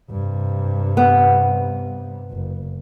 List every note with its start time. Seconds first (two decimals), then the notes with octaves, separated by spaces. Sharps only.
0.10 G2 C3
0.97 B3
2.31 F#1